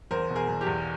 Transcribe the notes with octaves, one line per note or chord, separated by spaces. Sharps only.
E2 A#4 C5
B2
G#4 A#4
E2
G4
E2